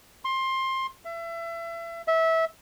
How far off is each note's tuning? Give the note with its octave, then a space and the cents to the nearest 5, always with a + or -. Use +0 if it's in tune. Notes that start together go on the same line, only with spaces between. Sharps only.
C6 +20
E5 +30
E5 -20